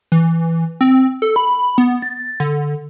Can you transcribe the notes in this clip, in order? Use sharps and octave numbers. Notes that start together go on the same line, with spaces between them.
E3
C4
A4
B5
B3
A6
D3